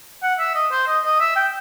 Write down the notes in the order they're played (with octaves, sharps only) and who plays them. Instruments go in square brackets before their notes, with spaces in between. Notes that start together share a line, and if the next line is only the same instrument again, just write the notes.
[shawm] F#5
E5
D#5
C5
D#5
D#5
E5
G5